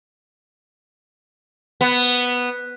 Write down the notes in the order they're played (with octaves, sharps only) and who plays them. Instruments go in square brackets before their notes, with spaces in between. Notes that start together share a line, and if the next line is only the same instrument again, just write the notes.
[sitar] B3